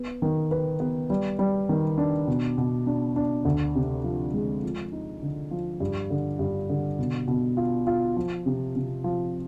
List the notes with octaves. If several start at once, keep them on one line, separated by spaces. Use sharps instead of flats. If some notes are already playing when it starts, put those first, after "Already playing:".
Already playing: B3
D#3
B4
B3
G3
G3
D#3
D4
B2
B2
D4
D4
D2
C3
F3
G#3
F3
D#4
D3
F3
G2
D3
G2
D3
B2
B2
F4
F4
F3
C3
C3
F3